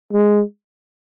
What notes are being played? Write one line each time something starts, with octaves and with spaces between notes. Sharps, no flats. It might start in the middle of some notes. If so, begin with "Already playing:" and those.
G#3